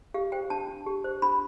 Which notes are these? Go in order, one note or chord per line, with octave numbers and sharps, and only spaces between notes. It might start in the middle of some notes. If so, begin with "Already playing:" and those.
G4 F5
C5 G5
D4 A5
D4
G4
C5
D4 B5